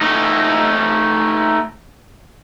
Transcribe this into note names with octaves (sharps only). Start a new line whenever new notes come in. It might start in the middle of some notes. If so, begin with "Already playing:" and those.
A3 D#4